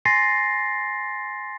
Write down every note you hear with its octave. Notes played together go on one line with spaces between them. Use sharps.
G#5 C6 A6 A#6 C7